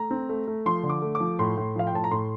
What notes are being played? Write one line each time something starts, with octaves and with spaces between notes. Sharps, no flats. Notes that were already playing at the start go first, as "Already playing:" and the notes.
Already playing: A3 A#5
C4
A3
A3
F3 C6
D3
D6
A3
D6
F3
A2 C6
A2
F3 F5
G5
A2 A5
A#5
A2 C6